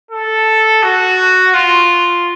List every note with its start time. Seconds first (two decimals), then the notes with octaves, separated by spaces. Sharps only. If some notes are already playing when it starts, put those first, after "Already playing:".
0.11 A4
0.83 F#4
1.54 F4